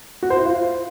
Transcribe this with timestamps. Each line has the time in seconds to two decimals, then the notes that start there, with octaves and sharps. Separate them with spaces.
0.23 F#4
0.30 C5
0.38 E4
0.46 F4